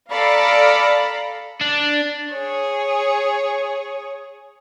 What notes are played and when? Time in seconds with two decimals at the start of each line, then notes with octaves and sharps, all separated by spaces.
0.10 A4 D5 F5 A#5 B5
1.61 D4
2.33 G#4 C#5